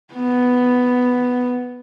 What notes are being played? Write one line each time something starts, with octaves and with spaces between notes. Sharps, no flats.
B3